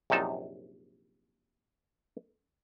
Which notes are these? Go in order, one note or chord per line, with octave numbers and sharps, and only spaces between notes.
A#1 F#2 C3 D#4 A5